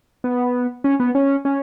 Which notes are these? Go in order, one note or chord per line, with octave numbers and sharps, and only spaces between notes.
B3
C#4
B3
C#4
C#4